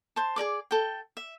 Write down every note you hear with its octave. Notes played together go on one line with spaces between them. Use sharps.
C5 A5
G#4 A#4 D5 D6
A4 G5
E5